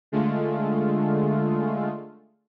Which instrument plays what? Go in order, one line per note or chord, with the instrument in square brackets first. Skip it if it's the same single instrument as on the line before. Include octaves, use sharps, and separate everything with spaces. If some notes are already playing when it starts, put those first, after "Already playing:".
[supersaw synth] D3 G#3 A3 F4